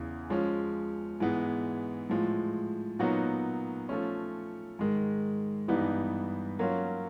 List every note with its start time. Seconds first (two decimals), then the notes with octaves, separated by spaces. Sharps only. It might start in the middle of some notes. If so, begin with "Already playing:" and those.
Already playing: E2 C#3 E3
0.30 F3 G#3 C#4
1.20 G#2 E3 G#3 B3
2.10 A2 F3 G#3
2.99 A#2 F#3 B3 D#4 F#4
3.89 F3 A3 C#4
4.79 G#2 D#3 G#3
5.68 G2 E3 G3 B3 D#4
6.59 F#3 A#3 C#4 F4